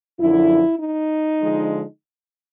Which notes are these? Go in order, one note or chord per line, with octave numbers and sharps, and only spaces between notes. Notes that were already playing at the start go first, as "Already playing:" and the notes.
F#2 D3 F3 E4
D#4
D3 F3 G#3